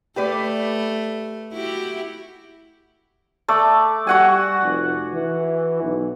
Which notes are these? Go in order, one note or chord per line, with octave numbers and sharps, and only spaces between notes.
A3 G4 B4 D5
E4 F#4 G4
A3 D5
G3 F#4 F#5 G#5
F1
E3
B1